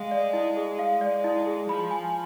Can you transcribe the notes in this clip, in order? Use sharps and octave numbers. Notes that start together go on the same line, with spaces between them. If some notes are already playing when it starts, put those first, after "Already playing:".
Already playing: G#3 G#4 F5
D5
E4
G#4
F5
G#3 D5
E4
G#4
F3 B5
G#5